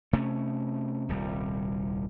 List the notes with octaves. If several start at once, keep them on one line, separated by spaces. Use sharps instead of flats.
C3 A3 C#4
D#1 C2 G3